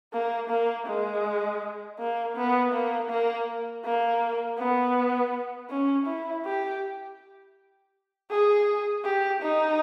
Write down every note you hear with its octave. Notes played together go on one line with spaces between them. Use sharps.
A#3
A#3
G#3
A#3
B3
A#3
A#3
A#3
B3
C#4
E4
G4
G#4
G4
D#4